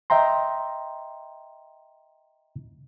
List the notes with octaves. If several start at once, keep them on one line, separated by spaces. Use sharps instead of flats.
D#5 E5 G5 A#5 C6